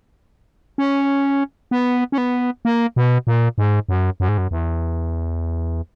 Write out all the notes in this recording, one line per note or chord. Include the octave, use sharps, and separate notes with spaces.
C#4
B3
C#4
B3
A#3
B2
A#2
G#2
F#2
F#2
G#2
F#2
E2